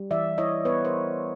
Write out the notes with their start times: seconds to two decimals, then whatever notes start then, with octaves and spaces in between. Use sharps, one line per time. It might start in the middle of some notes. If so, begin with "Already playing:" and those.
Already playing: G3
0.11 E3 D5 E5
0.38 E4 C#5 D#5
0.65 B3 B4 C#5
0.85 A#4 C5